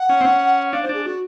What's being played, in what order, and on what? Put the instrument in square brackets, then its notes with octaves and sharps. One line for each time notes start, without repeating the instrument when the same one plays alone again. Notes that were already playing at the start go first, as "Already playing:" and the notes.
Already playing: [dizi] F#5
[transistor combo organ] C#4
C4
C#4
[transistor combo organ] D4 [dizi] F5
[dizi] C5
[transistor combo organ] D4 [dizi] G#4
[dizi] F#4